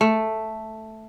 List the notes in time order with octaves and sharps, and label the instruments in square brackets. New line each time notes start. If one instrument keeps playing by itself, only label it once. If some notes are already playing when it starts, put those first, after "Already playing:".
[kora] A3